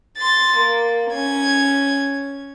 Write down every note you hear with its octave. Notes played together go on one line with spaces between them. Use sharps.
C6 A6
A#3
C#4 G#6